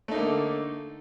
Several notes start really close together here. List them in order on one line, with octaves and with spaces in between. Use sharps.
A3 D#4 A#3 D3